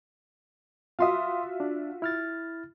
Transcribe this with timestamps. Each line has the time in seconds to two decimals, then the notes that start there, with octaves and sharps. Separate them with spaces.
0.99 F4 F#4 E5 F5 C6 D#6
1.60 D4
2.02 E4 F6 A6